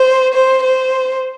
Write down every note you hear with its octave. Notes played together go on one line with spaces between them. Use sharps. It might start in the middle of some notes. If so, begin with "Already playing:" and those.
Already playing: C5
C5
C5